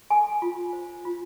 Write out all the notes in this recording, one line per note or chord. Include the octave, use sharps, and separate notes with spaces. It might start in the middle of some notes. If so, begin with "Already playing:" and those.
A4 G#5
F4
C5
F4